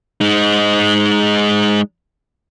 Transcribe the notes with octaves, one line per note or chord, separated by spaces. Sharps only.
G#3 D#4